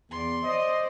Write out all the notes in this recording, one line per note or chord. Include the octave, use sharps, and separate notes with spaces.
E2 D5 C6
C5 D5 D#5